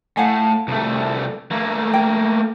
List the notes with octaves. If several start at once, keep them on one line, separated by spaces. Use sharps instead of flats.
A2 F5 F#5 G#5
C2 A3
A3 A#3
G5